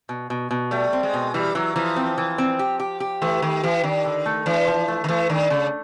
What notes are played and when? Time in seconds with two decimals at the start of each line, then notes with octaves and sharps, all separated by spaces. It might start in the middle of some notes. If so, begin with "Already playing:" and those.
0.09 B2
0.30 B2
0.51 B2
0.71 G3 A3
0.93 C4
1.03 G#3
1.13 B2
1.34 E3 G3
1.55 E3 F#3
1.76 E3 F3
1.96 C4
2.18 E3
2.38 C4
2.59 G4
2.80 G4
3.00 G4
3.22 E3 A3
3.42 D#3 G4
3.63 E3 G4
3.84 D#3 D4
4.05 D3
4.26 A3
4.46 E3 D4
4.67 F3
4.88 A3
5.04 D#3
5.08 E3 A3
5.29 D#3 D4
5.50 C#3 A3